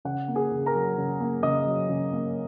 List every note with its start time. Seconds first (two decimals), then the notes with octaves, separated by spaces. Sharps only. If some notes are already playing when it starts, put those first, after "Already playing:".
0.05 C#3 F#5
0.28 A#3
0.35 G#4 G#5
0.51 C#3
0.66 A#4 A#5
0.74 F#3
0.98 C#3
1.20 A#3
1.43 C#3 D#5 D#6
1.66 F#3
1.89 C#3
2.13 A#3